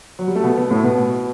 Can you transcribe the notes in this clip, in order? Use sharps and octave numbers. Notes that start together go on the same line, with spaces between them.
F#3
G3
A3
B2 B3
B2 B3
A2 A3
B2 B3